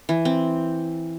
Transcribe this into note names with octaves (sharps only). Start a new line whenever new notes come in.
E3
C4